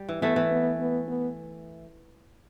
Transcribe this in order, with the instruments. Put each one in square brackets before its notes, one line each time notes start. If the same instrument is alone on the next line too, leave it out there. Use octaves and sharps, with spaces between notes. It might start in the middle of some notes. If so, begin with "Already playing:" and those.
Already playing: [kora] G3
E3
[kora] E3 A3 [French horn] B3
[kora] E3
[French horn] B3
B3
B3